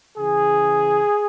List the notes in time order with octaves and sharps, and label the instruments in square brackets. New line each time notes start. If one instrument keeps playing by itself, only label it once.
[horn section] C#3 E3 G#4